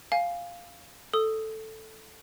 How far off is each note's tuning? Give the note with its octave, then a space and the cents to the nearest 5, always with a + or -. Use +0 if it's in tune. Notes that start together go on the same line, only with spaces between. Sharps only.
F5 +0 G#5 +0
A4 +0 D#6 +0